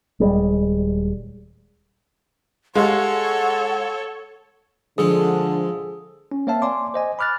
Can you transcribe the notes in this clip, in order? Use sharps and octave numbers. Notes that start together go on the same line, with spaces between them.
D#1 G3 G#3
G#3 G4 A4 C#5 F5 F#5 C6
G#2 D3 F3 G#4 A4
C#4
A#3 C4 C#5 E5 F5 A5
D5 G#5 C6 D6
C5 D#5 G#5
B5 D6 F6 F#6 A6